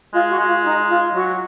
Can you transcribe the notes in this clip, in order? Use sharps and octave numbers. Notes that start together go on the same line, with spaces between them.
G#3 F4
F#4
G#3
F4
D#4
F4
F#3 F#4